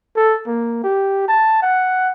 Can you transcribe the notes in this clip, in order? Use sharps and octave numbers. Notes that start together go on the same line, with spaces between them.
A4
A#3
G4
A5
F#5